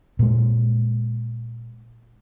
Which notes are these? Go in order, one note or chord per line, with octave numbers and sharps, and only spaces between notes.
A#2 G#3